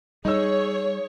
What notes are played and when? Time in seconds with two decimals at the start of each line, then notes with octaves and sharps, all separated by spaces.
0.25 G3 D#4 G#4 C#5 E6